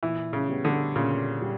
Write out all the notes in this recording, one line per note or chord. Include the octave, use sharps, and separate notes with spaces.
A#2 E3
C#3
G3 B3
D3
A#2 C#3
G3